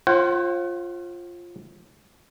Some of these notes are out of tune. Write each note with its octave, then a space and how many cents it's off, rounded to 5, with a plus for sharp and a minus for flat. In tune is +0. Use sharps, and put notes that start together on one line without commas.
F4 +0 C5 +40 F#5 +35